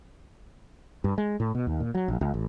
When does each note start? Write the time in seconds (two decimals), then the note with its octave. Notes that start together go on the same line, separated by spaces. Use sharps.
1.04 G2
1.18 G#3
1.40 A2
1.55 B2
1.67 D#2
1.80 A#2
1.95 F#3
2.08 A#1
2.21 C#2
2.34 A1